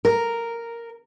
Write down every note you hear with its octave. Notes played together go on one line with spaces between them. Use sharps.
A#4